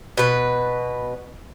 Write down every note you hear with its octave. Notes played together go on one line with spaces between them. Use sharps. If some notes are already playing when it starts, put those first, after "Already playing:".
B2 B4